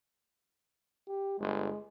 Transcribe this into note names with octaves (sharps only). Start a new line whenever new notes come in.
G4
G1 G#3